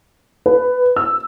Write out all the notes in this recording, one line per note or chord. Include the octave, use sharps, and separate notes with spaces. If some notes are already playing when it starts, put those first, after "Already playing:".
B4
E6